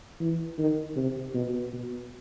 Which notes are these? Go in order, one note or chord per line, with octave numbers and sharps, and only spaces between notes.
E3
D#3
C3
B2
B2